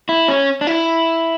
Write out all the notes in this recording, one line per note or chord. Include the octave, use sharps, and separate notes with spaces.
E4
C#4
D4
E4